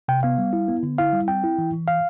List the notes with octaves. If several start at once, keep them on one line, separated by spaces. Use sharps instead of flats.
C3 G5
B3 F5
G3
E4
B3
D3
E4 F5
G3
C4 G5
E4
E3
E3
F5